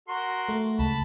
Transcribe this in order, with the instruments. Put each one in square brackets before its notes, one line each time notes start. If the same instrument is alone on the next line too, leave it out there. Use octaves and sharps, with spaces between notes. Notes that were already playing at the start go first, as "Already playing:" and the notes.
[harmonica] F#4 A#4 C6
[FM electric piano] A3
[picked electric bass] C#2 [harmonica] A5 B5